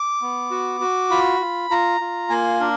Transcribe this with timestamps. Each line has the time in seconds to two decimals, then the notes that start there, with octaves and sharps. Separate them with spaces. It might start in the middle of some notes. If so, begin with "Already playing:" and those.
Already playing: D6
0.22 B3
0.51 F#4
0.81 F#4
1.10 F4 B5
1.40 F4
1.70 F4 A#5
2.00 F4
2.30 A#3 G#5
2.60 D4 A#4